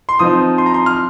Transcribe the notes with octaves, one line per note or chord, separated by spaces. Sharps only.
C6
F3 C4 D#4 D#6
C6
A#5
C6
F6